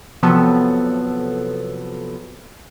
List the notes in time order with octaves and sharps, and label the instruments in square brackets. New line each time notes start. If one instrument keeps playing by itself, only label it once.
[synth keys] C3 F3 F#3 B3 A4